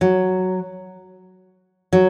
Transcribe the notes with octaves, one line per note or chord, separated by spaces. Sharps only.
F#3
F#3